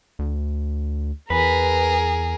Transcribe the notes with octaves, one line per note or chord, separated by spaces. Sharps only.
D2
E2 G#4 A#4 B4